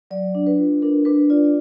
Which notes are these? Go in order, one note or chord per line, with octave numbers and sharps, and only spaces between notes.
F#3 D5
D4
B4
F4
D4 A#4
D4 B4
F4 D5
D5